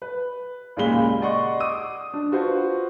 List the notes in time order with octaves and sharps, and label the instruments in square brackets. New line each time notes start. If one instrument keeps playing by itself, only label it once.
[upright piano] B4
D#2 A#2 C#3 G#3 B5 G7
D5 D#5 F#5 C6 C#6
D6 D#6 D#7
D4
F4 F#4 B4 C5